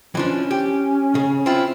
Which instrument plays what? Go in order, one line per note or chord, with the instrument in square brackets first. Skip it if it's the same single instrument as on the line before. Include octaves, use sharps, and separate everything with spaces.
[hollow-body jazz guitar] E3 F3 D4 [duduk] C#4
[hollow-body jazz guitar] G4
C#3
C4 E4 F4